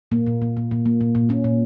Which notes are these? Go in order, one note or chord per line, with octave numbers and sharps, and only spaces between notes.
A#2 A#3
A#2
A#2
A#2
A#2
A#3
A#2
A#2
A#2 C#4
A#2